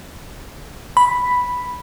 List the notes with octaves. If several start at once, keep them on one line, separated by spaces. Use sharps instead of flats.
B5